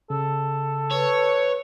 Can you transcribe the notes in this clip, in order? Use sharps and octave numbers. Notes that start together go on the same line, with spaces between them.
C#3 A4
B4 C#5